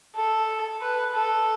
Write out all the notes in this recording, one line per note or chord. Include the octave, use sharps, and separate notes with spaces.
A4
B4
A4